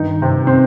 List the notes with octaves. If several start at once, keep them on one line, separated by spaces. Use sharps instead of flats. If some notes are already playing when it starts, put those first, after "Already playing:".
Already playing: G2 D#3 D#4
C3 C4
C4